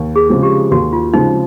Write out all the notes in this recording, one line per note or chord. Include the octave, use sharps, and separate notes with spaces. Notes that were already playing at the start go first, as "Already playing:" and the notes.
Already playing: D#2
G#4
C#3 F3 G#3 C4
G4
D#2 F#4
F4
C#3 F3 G#3 C4 D#4